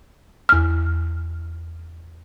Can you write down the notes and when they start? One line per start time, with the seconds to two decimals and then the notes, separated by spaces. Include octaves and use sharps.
0.49 E2 F6